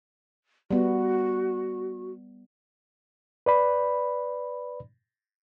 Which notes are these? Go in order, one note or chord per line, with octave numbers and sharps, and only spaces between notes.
G3 B3 F#4
B4 D5 B5